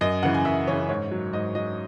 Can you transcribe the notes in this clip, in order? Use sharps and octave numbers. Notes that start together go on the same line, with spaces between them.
F#2 D#5
C#3 E3 F#5
G#5
F#2 E5
C#3 E3 C#5
G#2 C#5
F#3
G#2 D#5
F#3 D#5